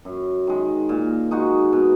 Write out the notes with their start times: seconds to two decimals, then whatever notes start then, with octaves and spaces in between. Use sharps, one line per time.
0.05 F#2
0.47 D#3 G#3
0.89 A#2
1.31 G#3 D#4 F#4
1.73 B2